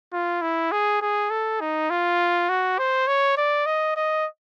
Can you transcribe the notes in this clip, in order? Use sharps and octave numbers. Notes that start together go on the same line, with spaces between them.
F4
E4
G#4
G#4
A4
D#4
F4
F#4
C5
C#5
D5
D#5
D#5